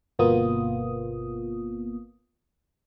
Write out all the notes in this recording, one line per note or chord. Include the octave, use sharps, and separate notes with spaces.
G1 B2 A#3 B3 F4 D#6